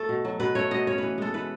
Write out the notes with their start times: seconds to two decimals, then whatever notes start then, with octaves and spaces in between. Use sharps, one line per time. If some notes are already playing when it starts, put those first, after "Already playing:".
Already playing: A3 A4
0.09 B2
0.25 F#3
0.40 B2 B4
0.55 A3 C#5
0.71 B2 D#5
0.87 C#4 C#5
0.98 E3 B4
1.18 G#3 A4
1.34 E3 B4